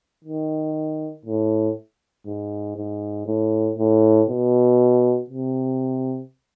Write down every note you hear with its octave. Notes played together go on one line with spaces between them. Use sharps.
D#3
A2
G#2
G#2
A2
A2
B2
C3